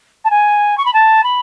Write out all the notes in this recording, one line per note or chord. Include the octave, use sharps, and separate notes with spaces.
A5
G#5
C#6
B5
A5
B5